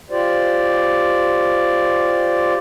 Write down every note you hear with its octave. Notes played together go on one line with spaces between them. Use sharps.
F4 G4 C5 D5